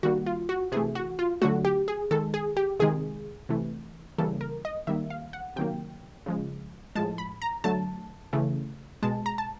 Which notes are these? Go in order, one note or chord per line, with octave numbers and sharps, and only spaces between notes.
D#3 G3 A#3 F#4
F4
F#4
C3 E3 A3 G#4
F#4
F4
D3 F#3 A3 F#4
G4
G#4
D#3 G#3 A4
G#4
G4
C3 D#3 G#3 G#4
C3 E3 A3
C#3 E3 G3 A#3 A4
A#4
D#5
D#3 G3 A#3 E5
F5
F#5
C3 D#3 F#3 A#3 G5
C#3 F3 G#3
A2 F3 G#3 A5
B5
A#5
D3 F#3 A3 A5
C#3 E3 A3
B2 G#3 A5
A#5
A5